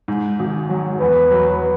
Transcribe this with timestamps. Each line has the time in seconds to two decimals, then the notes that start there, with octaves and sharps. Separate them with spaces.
0.08 G#2
0.39 G#1
0.69 F#3
1.00 E2 B4
1.31 F#3